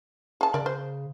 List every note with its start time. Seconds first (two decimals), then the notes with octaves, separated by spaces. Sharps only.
0.41 G#4 A5
0.54 C#3 A#4 D5
0.66 C5